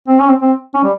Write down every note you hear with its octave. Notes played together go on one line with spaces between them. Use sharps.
C4
C#4
C4
C4
C#4
G3